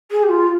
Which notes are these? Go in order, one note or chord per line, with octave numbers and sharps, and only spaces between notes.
G#4
G4
F4